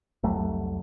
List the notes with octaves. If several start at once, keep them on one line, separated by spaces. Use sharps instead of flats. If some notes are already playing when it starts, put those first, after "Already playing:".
C2 F2 F#3 A3